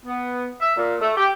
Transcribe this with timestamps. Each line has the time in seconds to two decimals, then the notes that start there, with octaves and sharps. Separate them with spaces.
0.05 B3
0.60 E5
0.77 A#2
1.01 A3
1.17 G4